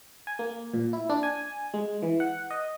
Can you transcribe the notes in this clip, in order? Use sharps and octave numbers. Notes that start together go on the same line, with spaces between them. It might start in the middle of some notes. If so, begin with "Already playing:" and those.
G#5
A#3
A#2
E4
D4
G#5
G#3
E3
F#5
D#5